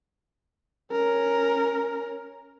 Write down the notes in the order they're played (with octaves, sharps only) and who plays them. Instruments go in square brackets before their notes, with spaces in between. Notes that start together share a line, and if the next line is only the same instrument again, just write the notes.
[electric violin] C#4 A#4